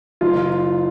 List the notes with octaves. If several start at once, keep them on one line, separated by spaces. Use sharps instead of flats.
F#1 F4